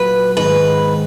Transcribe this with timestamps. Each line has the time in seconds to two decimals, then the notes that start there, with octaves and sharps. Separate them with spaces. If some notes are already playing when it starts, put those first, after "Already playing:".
Already playing: A#2 F#3 B4
0.37 G#2 D#3 G#3 B3 D#4 B4